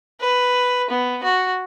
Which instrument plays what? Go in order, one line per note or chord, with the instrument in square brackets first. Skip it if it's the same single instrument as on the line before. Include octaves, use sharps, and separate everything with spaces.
[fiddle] B4
B3
F#4